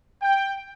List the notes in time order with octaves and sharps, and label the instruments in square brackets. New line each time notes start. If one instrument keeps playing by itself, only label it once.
[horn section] G5